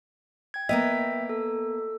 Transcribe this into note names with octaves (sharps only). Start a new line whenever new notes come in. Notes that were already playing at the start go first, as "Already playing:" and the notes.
G5 G#6
A#3 B3 D#5 E5 G5
A4